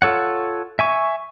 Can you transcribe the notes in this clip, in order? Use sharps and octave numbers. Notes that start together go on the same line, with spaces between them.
F4 A4 C#5 F#5
E5 G#5 C#6